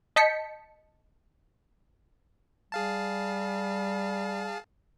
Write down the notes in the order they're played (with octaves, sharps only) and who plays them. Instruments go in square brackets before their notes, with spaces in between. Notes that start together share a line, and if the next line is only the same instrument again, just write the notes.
[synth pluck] D#5 A5 G6 B6 C#7
[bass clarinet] G3 [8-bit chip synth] G#4 F5 A5